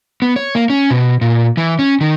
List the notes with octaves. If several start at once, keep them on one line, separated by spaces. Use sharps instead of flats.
B3
C#5
A#3
C#4
B2
A#2
E3
C#4
D#3